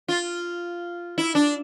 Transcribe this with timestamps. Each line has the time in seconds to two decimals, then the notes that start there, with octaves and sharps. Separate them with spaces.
0.08 F4
1.18 E4
1.35 D4